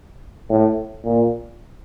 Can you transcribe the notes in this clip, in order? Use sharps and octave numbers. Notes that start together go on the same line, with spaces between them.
A2
A#2